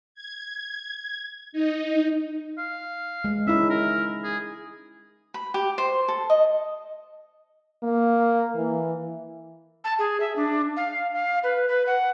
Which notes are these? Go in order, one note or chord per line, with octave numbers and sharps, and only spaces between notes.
G#6
D#4
F5
G#3
C#4 D#4 E4 E5
A#4
G#4
B5
G4
C5
A4
D#5
A#3
E3
A5
G#4
E5
D4
F5
F5
B4
B4
F#5